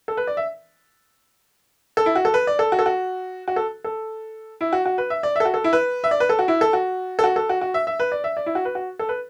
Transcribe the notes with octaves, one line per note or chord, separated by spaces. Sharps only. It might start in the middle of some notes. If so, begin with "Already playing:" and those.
A4
B4
D5
E5
A4
E4
F#4
A4
B4
D5
A4
F#4
A4
F#4
F#4
A4
A4
E4
F#4
F#4
B4
E5
D5
E5
A4
F#4
A4
E4
B4
E5
D5
B4
A4
F#4
E4
A4
F#4
A4
F#4
A4
F#4
F#4
E5
E5
B4
D5
E5
D5
E4
F#4
B4
F#4
A4
B4